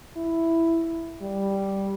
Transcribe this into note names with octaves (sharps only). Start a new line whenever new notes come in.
E4
G3